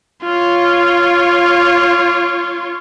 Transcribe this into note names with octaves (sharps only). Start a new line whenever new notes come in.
F4 C#5